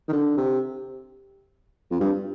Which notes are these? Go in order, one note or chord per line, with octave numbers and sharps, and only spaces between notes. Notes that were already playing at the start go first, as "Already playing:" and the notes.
D#3
D3
C3
F2
G2